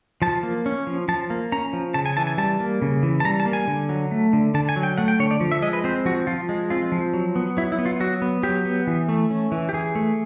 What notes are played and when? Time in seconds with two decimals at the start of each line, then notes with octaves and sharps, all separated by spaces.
0.22 F3 A5
0.43 A#3
0.66 C#4
0.87 F3
1.08 F3 A5
1.30 A#3
1.52 C#4 A#5
1.73 F3
1.94 C#3 A5
2.06 G#5
2.17 E3 A5
2.27 G#5
2.38 G3 A5
2.60 A#3
2.82 C#3
3.03 E3
3.20 A5
3.25 G3 A#5
3.40 A5
3.46 A#3
3.53 G#5
3.68 D3
3.89 F#3
4.11 A3
4.33 D3
4.54 D3 A5
4.69 G#5
4.76 F#3
4.83 G5
4.98 A3 F#5
5.08 G5
5.19 D3 C#5
5.31 D5
5.40 F3
5.52 E5
5.62 G#3 D#5
5.73 B4
5.84 C4 C5
6.05 F3 F#4
6.27 F3 F4
6.49 G#3
6.70 C4 F4
6.92 F3
7.13 F#3
7.36 B3
7.57 F#3 E4
7.72 E4
7.78 B3
7.86 F4
8.00 F#3 F#4
8.22 B3
8.43 F#3 G4
8.65 B3
8.87 E3
9.09 A3
9.30 C#4
9.52 E3
9.69 G4
9.73 E3 G#4
9.95 A3